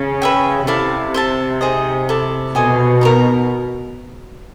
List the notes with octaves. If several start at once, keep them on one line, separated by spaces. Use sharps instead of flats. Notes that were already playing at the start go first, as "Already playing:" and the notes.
Already playing: C#3
B4 E5 G5
C3 E4 A4 D5 F5
C5 E5 A5
D#4 G#4 C5 D#5
E4 A4 D5
B2 A4 C5 D#5 G#5
D#4 G4 A#4